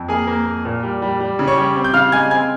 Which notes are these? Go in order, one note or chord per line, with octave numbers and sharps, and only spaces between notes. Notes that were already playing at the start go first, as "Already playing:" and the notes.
Already playing: F2
A#3 G#4 G#5
A#3
A#3
A#2
G3
G3
G3
C#3
C#5 C#6
G3
C4
G6
C#3 F5 F6
G#3 G#5 G#6
C4 G#5 G#6